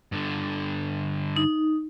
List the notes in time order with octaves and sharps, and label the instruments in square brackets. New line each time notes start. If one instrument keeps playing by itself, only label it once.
[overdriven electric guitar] G2 D3
[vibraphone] D#4